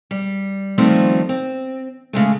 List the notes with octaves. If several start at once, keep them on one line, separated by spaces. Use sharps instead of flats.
G3
D#3 F3 G3 A3 C4 F4
C4
C#3 G#3 A3